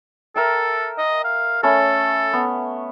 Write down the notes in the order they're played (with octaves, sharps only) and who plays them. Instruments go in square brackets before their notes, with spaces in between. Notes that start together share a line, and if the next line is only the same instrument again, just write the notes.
[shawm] A4 [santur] A#4 E5 G5
[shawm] D#5
F5
[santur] A3 C#4 B5 [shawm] A4
[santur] B3